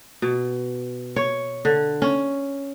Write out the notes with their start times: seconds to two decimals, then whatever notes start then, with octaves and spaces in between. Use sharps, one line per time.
0.22 B2
1.16 C#5
1.65 D3
2.02 C#4